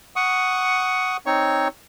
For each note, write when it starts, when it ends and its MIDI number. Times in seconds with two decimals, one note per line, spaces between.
0.16 1.17 78
0.16 1.17 85
0.16 1.17 87
1.26 1.68 60
1.26 1.68 63
1.26 1.68 73
1.26 1.68 85